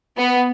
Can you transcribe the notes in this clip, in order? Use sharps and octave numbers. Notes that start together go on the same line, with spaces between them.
B3